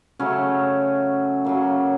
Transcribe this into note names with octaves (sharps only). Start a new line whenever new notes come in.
C#3 F#3 A3 C#4
C#3 F#3 A#3